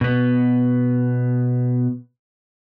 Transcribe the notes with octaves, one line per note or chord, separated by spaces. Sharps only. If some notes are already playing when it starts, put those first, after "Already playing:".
B2 B3